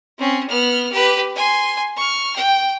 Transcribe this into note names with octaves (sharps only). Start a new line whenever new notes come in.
C4 C#4
B3 F6
G4 B4
G#5 C6
C#6 F6
G5